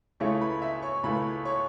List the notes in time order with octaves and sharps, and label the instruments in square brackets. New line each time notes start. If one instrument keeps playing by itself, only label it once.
[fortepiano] C#2 C#3 A3 E4 [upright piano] C#5 C#6
[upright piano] B4 B5
E5 E6
C#5 C#6
[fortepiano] C#2 C#3 A3 E4 [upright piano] B4 B5
[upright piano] C#5 C#6